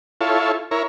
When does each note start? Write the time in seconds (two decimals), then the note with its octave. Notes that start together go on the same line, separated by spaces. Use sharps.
0.21 E4 F4 A4 C#5
0.71 E4 A#4 C#5